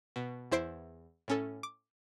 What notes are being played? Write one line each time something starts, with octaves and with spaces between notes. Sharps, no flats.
B2
E2 E4 C5 C7 D7
A2 C#4 A4
D6